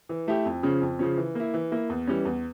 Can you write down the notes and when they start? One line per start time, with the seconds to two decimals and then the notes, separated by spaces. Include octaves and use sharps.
0.09 E3
0.28 A3 E4 G4
0.45 F2
0.63 C#3 F3 C#4
0.82 F2
0.99 C#3 F3 C#4
1.17 E3
1.35 A#3 E4
1.54 E3
1.72 A#3 E4
1.90 E2
2.07 E3 G3 C#4
2.25 E2